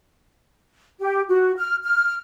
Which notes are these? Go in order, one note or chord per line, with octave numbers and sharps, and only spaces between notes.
G4
F#4
F6
F6